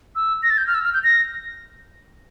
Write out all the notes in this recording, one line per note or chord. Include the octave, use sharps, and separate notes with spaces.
E6
A#6
A6
G6
F6
E6
F6
G6
A#6